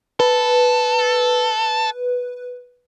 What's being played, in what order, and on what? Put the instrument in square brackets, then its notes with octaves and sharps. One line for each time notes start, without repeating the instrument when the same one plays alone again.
[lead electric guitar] A4 [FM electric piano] B4